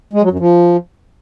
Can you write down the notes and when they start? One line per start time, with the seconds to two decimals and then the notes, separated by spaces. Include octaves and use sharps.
0.13 G#3
0.22 F#3
0.31 F#2
0.39 F3